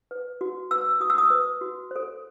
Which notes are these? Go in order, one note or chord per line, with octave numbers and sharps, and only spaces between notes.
B4
F#4
B4 E6
F#4 D#6
E6
D#6
B4
F#4
A4 C5